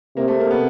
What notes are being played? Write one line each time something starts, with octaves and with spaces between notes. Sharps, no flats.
C3 A#3
A3
A#3
B3